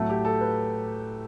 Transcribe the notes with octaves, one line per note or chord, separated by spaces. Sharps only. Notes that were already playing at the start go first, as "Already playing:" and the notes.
Already playing: A2 F#3 A3 A4
G4
A4
B4